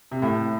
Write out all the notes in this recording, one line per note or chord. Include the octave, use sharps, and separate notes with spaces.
C3
A2